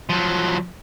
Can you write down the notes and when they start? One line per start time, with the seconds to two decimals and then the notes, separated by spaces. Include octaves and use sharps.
0.09 F3 F#3